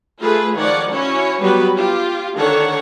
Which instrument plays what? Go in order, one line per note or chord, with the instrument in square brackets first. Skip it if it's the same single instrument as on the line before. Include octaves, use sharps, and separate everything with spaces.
[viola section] A3 F4 G#4 B4
D#3 F3 C#5 D5 F#5
C#4 E4 F#4 C#5
F#3 G3 B3 G4 B4
F4 G4
D3 D#3 D4 A4 C#5 F#5